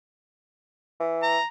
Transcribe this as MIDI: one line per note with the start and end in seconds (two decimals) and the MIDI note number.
1.00 1.38 52
1.23 1.46 82